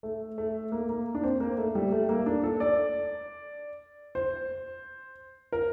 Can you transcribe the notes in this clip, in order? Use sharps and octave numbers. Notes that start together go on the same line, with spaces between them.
A3
A3
A#3
A#3
D4
C4
A#3
A3
G3
A3
A#3
D4
A4
D5
C5
A#4